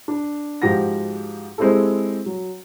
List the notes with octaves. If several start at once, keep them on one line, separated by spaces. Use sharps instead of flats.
D4
G#2 F3 F#4 G4 F#5 A#6
G#3 C4 E4 G4 A4
F#3